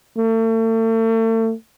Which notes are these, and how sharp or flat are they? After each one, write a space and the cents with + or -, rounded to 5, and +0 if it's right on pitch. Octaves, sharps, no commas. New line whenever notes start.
A3 +40